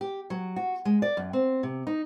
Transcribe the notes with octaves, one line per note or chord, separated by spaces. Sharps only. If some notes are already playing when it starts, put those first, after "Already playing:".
G4
F#3
F#4
G#3
D5
F#2
C4
C3
D#4